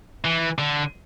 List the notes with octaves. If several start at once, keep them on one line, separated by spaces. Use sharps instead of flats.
E3
D3